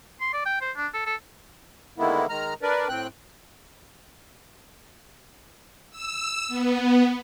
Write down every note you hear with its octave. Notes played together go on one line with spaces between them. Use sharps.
C6
D5
G5
C5
D4
A4
A4
D3 D#3 G#3 A#3 B3 E4
D#3 G#3 A#5 F6
D4 A#4 B4 D5
A2 C4 G5 F#6
E6
B3